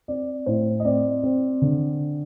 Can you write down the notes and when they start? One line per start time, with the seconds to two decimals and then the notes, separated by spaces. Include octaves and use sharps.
0.08 C4 D5
0.46 A2 C5
0.80 D#5
0.85 C4 D5
1.23 C4
1.62 D3